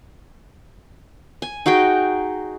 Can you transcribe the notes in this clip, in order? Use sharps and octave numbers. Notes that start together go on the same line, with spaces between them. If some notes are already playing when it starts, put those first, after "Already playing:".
G#5
D#4 F#4 G#4 G5